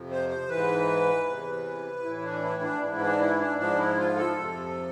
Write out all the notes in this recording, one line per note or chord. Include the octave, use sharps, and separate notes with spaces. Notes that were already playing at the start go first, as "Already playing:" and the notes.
Already playing: F2 C3 F3
C5
C5
G#2 E3 B4
E2 C3 E3
A2 E3 E4
D4
E4
D4
G#2 E3 E4
D4
E4
D4
G#2 F3 D4
E4
F4
A4
F2 C3 F3